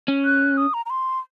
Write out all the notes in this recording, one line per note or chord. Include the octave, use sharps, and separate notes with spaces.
C#4
F#6
D#6
A#5
A#5
C6